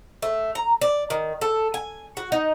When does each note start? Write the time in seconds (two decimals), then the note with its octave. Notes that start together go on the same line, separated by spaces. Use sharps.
0.22 A3
0.55 A#5
0.81 D5
1.10 D#3
1.41 A4
1.74 G#5
2.17 F#4
2.32 D#4